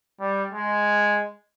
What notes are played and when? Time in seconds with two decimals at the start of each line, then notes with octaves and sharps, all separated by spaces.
0.21 G3
0.53 G#3